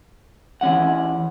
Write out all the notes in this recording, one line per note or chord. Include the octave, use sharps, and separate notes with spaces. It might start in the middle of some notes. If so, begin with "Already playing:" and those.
E3 C#4 F#5